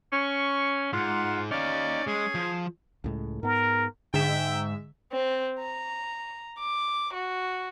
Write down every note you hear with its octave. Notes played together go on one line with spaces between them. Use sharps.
C#4 C#6
G#2 F4 F#5
C#4 D#4 D5 F5
G#3 G#4
F3
C#2 A2 G#3
G#2 B3 A#4
G#2 D3 E5 G5
C4
A#5
D6
F#4